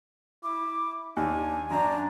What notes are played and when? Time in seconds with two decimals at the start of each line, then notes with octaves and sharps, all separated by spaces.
0.43 E4 D6
1.17 D#2 D4 G#5
1.71 F#2 D4 A#5